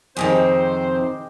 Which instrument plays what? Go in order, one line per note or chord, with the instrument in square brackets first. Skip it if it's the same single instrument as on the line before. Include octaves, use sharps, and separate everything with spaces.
[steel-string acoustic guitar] F2 C3 D#3 [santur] G#3 G4 D#5 [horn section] C4 C5